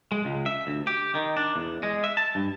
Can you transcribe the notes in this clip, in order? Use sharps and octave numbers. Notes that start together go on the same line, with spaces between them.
G#3
C#2
E5
D2
G4
D#3
D4
E2
G#3
E5
A5
G2